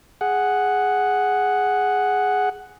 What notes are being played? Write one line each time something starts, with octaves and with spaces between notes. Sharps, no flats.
G#4 F#5